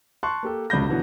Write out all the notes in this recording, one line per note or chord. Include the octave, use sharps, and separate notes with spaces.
A5 C6 C#6 F#6
A#3 G4 A4
E1 C#2 B5 G6 A#6
B2 D3 E3 F#3 B3